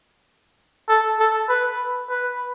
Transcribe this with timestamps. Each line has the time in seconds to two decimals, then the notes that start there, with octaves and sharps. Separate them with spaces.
0.89 A4
1.20 A4
1.49 B4
2.09 B4